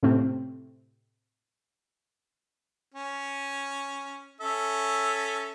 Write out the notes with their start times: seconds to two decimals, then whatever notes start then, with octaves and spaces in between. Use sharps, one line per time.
0.03 A2 C3 A3 C4
2.94 C#4
4.41 C#4 A4 E5